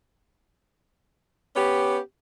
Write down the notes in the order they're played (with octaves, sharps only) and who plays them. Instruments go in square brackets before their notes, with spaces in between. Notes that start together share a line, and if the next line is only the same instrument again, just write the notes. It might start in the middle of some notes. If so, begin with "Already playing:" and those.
[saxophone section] B3 C#4 G4